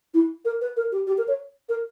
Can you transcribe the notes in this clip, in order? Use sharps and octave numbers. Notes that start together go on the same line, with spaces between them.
E4
A#4
B4
A#4
G4
G4
A#4
C#5
A#4